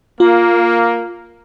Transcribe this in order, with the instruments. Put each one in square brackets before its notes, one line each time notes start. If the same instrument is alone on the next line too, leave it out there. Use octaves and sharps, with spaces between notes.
[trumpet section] A#3 [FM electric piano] F4